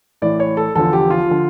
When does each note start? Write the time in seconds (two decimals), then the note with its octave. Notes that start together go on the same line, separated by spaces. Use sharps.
0.22 A2 E3 D5
0.40 C#5
0.57 A4
0.75 E2 D3 F3 A4
0.93 G4
1.11 F4
1.29 D3 F3